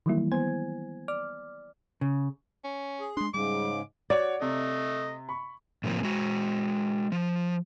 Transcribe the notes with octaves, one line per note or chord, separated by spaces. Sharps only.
D#3 E3 F#3 G3 A#3 E4
B3 C5 G#5 G#6
D5 D6 F6
C#3
C#4
G#4
G#3 D4 C6
G#2 C#3 G3 D6
F#4 C#5 D5 F#5
C3 A3 D#5
B5 C#6
A2 C3 E3 F3 A#3
G#3 F#4
F3